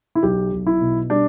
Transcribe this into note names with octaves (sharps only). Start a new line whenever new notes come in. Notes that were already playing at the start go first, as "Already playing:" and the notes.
E4
B1 G4
B1
E4
B2
G3 D4